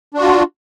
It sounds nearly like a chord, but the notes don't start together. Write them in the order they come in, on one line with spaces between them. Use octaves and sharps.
D4 F#4 F4